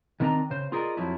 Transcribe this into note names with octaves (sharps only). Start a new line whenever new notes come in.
D#3 B3 C4 D4 D#5 A#5
C#3 C5
F4 G#4 A#4 B4 D5 D#5
F2 F3 F#3 E4